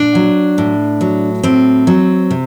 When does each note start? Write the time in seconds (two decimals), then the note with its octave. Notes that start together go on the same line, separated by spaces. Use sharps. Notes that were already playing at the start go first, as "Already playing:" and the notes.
Already playing: A#2 D4
0.15 F#3
0.58 A2
1.01 F#3
1.43 A2 C4
1.87 F#3
2.31 C3